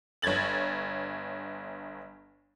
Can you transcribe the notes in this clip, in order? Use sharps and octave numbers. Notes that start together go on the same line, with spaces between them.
G1 C#5 G#6 A6 F#7